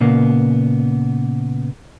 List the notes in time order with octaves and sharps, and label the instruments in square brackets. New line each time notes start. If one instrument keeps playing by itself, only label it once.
[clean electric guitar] A#2 C#3 A#3 B3